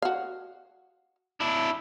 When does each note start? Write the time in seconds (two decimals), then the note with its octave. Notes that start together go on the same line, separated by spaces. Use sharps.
0.02 F#4 F5
1.40 D4 E4